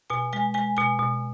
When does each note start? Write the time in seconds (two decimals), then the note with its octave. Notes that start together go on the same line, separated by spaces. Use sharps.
0.10 B2 G#5
0.33 G#3 G#5
0.54 G#3 G#5
0.77 B2 G#5
0.99 B2